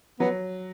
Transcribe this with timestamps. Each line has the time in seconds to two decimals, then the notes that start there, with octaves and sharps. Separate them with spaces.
0.19 F#3 B3